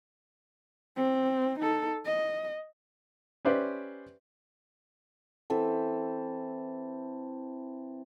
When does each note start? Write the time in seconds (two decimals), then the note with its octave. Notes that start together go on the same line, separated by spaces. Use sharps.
0.96 C4
1.59 D#4 A4
2.06 D#5
3.45 C#4 G4 B4 C5 D5 E5
5.50 E3 C4 A4